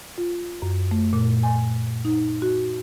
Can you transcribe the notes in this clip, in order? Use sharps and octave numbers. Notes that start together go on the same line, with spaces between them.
F4
F#2
A3
A#2
G#5
D#4
F#4